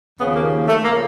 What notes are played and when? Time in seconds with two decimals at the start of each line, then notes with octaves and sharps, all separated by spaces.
0.18 D#2 C#3 F3 B3
0.35 A#3
0.68 A3
0.85 C#3 F3 A#3